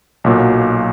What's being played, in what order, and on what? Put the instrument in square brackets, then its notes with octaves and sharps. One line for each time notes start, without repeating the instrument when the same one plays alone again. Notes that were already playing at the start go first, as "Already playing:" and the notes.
[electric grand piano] B1 A#2 F#3